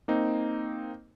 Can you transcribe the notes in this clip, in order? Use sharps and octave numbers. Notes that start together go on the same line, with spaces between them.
A#3 C4 D#4